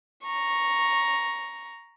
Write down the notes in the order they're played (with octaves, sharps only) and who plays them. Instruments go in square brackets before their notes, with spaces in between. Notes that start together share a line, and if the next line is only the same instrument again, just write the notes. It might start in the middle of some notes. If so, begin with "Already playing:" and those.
[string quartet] A#5 C#6